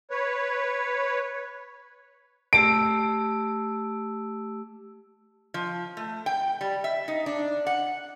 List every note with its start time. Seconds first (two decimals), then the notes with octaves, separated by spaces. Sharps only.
0.11 B4 C#5
2.53 A3 G4 E6 D7
5.54 F3
5.97 A3
6.26 G5
6.61 G3
6.84 E5
7.08 D#4
7.26 D4
7.67 F#5